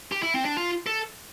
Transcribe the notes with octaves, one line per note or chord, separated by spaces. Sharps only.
G4
E4
C4
D4
F4
A4